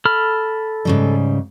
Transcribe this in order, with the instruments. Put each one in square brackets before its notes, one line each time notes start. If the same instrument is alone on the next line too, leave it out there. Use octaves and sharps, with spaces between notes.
[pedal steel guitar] A4 B5 F6
[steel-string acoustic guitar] G#2 C#3 G3